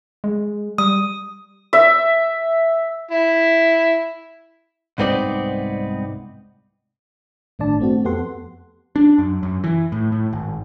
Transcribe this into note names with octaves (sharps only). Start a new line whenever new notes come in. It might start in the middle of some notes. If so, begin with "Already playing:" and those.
G#3
G3 D#6
E5
E4
C2 G#2 B3 C4 D#4 D5
G1 A2 D#3 D4 D5 A5
A3 C4 F#4
F2 B3 G4 A4 F#5 C6
D4
F#2
F#2
E3
A2
A2
G#1